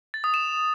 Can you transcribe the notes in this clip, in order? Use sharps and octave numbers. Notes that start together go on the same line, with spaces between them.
A6
D#6
E7